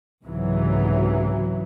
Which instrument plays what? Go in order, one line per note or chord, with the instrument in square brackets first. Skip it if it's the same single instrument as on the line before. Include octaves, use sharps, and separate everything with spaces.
[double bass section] C2 G#2 C#3 E3 F#3